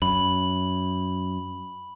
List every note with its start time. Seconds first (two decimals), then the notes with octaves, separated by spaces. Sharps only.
0.02 F#2 B5 F#7